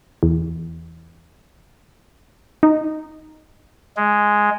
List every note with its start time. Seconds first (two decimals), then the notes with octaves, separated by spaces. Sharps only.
0.23 E2
2.63 D#4
3.97 G#3